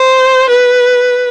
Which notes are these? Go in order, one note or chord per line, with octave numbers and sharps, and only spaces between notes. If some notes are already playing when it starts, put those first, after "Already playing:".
Already playing: C5
B4